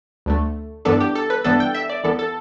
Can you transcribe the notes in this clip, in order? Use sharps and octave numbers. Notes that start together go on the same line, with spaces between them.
D2 D3 A3
G2 E3 B3 D4 A4
G4
A4
B4
G2 E3 B3 D4 A4
G5
E5
D5
E2 E3 B3 A4
A4